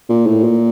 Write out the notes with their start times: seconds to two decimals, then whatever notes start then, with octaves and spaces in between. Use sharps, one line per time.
0.09 A#2
0.26 A2
0.44 A#2